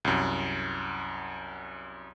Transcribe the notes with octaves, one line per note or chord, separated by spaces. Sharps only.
C2 F#2